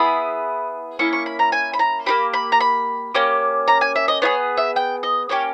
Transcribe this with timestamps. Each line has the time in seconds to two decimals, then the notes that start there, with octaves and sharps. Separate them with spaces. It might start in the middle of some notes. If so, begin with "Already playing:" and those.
Already playing: B3 E4 G#4 B5
0.99 A#3 C#4 E4 C#6
1.13 C#6
1.26 B5
1.39 A#5
1.52 G#5
1.73 B5
1.79 A#5
2.06 A#3 D#4 G4 B5
2.33 B5
2.52 A#5
2.60 B5
3.14 A#3 C#4 G4
3.68 A#5
3.81 G#5
3.96 E5
4.08 D#5
4.22 B3 E4 G#4 C#5
4.57 E5
4.76 G5
5.03 D#5
5.29 A#3 C#4 G4 C#5